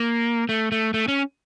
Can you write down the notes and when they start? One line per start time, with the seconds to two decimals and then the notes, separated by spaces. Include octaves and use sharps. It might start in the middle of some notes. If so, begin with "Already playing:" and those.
Already playing: A#3
0.49 A3
0.72 A3
0.94 A3
1.08 C#4